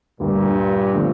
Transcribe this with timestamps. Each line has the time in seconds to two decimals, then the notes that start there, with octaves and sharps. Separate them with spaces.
0.20 D2 G2 A#2 D3 G3 A#3
0.94 D3 F3 A3 C4